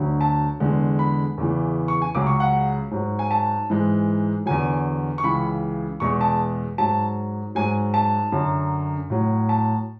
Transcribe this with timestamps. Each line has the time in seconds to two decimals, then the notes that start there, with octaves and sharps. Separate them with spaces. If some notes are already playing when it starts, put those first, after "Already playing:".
Already playing: D2 D3 F#3
0.21 A5
0.60 E2 D3 G#3
0.99 B5
1.38 E2 C#3 E3
1.88 C#6
2.02 G#5
2.15 C#2 C#3 F#3 D6
2.27 C#6
2.40 F#5
2.91 G#2 F#3
3.19 G#5
3.31 A5
3.70 G#2 E3 G#3
4.46 E2 D3 F#3 G#5
5.18 C#6
5.23 C#2 C#3 E3 B5
6.00 E2 B2 G#3 C#6
6.21 A5
6.78 G#2 F#3 A5
7.55 G#2 F#3 G#5
7.94 A5
8.32 F#2 D3 F#3
9.10 A2 F#3
9.49 A5